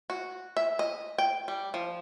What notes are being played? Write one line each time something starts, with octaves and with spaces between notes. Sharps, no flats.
F#4
E5
D#5
G5
G3
F3